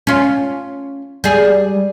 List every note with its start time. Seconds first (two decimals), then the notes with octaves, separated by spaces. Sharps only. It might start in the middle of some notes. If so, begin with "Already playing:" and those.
0.07 C#4 F4
1.24 G3 G#4